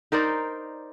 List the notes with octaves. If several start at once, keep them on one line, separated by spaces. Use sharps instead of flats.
D#4 A#4 C5 D5